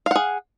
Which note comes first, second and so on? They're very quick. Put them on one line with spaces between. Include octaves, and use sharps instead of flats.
F5 F#5 G#4